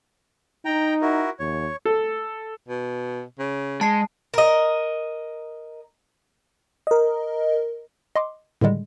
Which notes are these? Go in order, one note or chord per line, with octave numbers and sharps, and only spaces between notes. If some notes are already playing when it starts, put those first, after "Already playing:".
D#4 G5 A#5
E4 F#4 A#4
D#2 C#5
A4
B2
C#3
G#3 A5 C7
A#4 D#5
A#4 D#5
D#5 C6 D6
A2 D3 D#3 G3 G#3